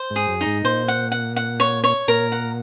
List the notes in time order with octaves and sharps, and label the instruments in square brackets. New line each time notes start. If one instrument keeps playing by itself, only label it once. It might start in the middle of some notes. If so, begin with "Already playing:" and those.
Already playing: [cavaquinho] C5
[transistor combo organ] G#2
[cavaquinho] G#4
[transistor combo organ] F#2
[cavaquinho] D#4
[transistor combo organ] G#2
[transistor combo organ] A#2 [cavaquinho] C5
[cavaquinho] F#5
F#5
F#5
C#5
C#5
[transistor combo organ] A#2 [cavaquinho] A#4
[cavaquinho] F#5